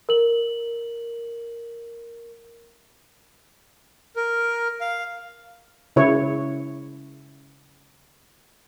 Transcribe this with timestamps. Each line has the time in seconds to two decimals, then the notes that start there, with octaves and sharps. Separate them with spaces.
0.09 A#4 F#7
4.16 A#4
4.81 F5
5.96 C#3 E4 C#5